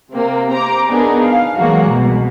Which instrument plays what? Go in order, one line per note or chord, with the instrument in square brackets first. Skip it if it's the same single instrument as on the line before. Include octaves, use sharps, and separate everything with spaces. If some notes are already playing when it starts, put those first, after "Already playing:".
[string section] C3 A#3 C4
C5 A#5 D6
B3 D4 D#4 G#4 A#4
F5
E3 F#3 G#3 A#3 F#4
C2 B2